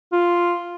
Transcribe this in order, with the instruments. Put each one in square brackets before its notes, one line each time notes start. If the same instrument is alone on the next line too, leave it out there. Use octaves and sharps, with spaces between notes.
[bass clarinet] F4